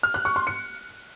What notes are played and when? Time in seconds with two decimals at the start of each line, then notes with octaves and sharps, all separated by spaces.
0.03 F6
0.14 F#6
0.25 C#6
0.36 C6
0.47 C#7